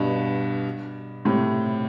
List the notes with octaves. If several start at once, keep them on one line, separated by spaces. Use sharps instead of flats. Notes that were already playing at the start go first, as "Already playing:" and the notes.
Already playing: G2 B2
A2 C3